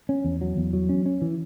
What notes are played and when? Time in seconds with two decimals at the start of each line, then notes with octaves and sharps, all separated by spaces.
0.09 C#4
0.24 E2
0.41 F#3
0.57 E2
0.73 F#3
0.89 C#4
1.06 C#4
1.22 E3